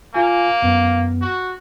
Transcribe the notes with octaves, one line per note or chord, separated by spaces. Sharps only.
A#3 F4 G#5
F#2 B3
F#4